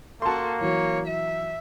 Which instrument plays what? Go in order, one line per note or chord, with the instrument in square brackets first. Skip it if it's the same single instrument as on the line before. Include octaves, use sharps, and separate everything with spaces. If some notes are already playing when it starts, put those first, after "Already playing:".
[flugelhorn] A#3 [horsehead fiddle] F#4 A4 [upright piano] A5 C6
[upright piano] E3 F#3 [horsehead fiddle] C#5
[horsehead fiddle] E5